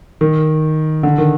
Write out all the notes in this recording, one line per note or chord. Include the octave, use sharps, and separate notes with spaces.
D#3
D3
D#3